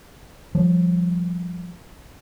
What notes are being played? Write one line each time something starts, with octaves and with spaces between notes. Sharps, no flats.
F3 G3